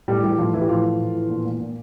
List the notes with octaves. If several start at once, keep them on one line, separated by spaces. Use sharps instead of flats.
A2 G3 G4
E3 G3 G4
A2 F3 F4
E3 E4
G4
A2 F3 F4
E3
A2
E3
A#2
A#2
A#2